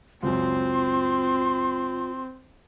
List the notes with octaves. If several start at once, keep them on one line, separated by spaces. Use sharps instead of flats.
C#2 F#2 C4 F4 C6